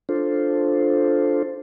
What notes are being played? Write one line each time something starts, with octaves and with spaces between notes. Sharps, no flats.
D4 F4 A4 C5